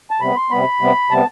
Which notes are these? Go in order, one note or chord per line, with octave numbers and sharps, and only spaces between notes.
A5
C3 G3 B3 B5
C6
C3 G3 B3 B5
C3 G3 B3
C3 G3 B3 A5